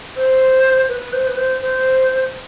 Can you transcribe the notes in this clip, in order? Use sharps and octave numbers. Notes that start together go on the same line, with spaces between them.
C5
B4
C5
B4
C5
C5